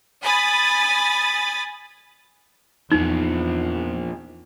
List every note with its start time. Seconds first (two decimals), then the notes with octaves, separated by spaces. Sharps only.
0.21 G#5 B5 D#6 A6
2.92 E2 A#2 F3 D#4